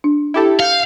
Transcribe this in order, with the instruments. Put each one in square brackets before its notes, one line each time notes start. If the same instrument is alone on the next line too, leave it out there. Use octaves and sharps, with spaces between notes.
[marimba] D4
[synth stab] E4 G4 A4
[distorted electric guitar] F5 [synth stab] G6 C#7